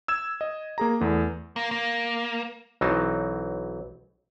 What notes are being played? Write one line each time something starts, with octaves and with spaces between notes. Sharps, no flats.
E6 G#6 E7
D#5
A#3 G#4 A#5
E2 A3 B3
A#3
A#3
B1 E3 F#3 C4 D#4 A5